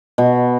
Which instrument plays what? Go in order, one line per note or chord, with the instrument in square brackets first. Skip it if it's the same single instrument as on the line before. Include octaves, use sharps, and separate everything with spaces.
[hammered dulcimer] B2